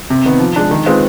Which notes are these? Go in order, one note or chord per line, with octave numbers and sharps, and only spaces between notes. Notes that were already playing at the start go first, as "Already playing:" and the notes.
C3
D#3 B3
F3
G#3 D4
D#3
G#3 C4 F4 B4